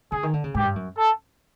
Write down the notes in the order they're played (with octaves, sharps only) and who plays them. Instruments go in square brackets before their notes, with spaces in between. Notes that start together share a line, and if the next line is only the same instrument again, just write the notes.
[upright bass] D3 [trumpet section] G#4
[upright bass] D#3
D3
C#3
[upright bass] G#2 [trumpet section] G4
[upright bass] G2
F#2
[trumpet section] A4